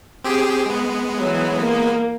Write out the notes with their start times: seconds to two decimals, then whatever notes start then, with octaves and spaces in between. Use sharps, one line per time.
0.24 C4 G4 G#4
0.66 G#3 B3
1.20 E3 F#3
1.61 A#3